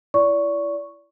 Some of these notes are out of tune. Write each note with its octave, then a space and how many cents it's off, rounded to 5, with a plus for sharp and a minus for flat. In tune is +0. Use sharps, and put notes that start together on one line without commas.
E4 +25 D5 -35 C#6 +0